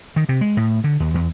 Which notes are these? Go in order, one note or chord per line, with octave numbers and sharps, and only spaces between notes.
D#3
C3
G#3
A2
D3
D#2
E2